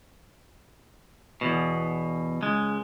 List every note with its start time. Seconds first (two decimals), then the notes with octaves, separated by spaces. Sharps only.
1.41 E2 G#2 B2
2.42 C#2 G#3